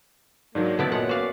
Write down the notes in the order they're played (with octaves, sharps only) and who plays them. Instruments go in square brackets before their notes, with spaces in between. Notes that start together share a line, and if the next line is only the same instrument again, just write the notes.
[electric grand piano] G#2 D#3 F#3 [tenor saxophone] A#3 [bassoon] D4
[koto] B3 E4 D5 [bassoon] A4
[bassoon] F#2 [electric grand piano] A#2 [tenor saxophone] G#3 [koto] F#5
[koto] F#4 F5 [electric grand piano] B4 [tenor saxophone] D5